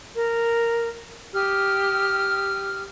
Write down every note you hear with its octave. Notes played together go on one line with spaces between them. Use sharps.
A#4
G4 D#6 F6